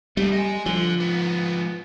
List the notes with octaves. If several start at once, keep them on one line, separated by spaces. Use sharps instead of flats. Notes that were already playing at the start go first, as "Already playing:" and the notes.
F#2 G3 A3
D#5 G#5
D3 F3
G#2 B3